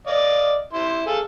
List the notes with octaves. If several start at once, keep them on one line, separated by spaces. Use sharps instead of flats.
D5 D#5 F5
E4 C5 C6
G#4 A4 F5